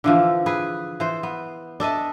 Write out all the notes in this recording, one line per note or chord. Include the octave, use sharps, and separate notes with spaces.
D3 E3 F3
G#4 B4
E3 C5
B3
D4 A4 D#5 E5